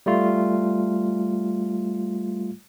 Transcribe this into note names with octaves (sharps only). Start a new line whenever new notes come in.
G3 A3 F4